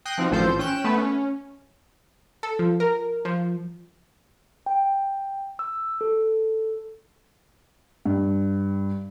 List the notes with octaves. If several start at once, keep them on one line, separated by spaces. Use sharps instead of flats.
G5 D#6 F#6 A#6 C7
F3 C4 D#4 F#4
A1 F3 A4 C5 G6
C#4 G5 F#6 E7
A3 B3 B4
C#4
A4
F3
A#4
F3
G5
E6
A4
G2